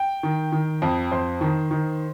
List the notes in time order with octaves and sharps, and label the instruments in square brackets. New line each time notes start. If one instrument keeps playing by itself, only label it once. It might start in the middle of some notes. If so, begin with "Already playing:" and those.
Already playing: [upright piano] G5
D#3
D#3
F2
F2 C5
D#3
D#3